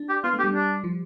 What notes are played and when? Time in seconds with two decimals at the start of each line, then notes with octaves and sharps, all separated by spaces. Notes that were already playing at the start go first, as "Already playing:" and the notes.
Already playing: D4
0.09 G4
0.24 B3 F4
0.34 A3
0.39 G4
0.44 G3
0.54 D4
0.84 F3